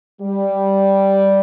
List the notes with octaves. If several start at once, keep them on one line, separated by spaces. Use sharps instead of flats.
G3